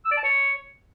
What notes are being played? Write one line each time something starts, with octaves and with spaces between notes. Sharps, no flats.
E6
D5
A5
C#5